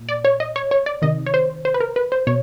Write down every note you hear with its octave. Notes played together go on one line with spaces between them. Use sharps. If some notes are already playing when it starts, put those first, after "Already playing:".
Already playing: A#2
D5
C#5
D#5
C#5
C#5
D5
C3 D#3 D#5
C#5
C5
C5
B4
A#4
B4
C5
B2 C#5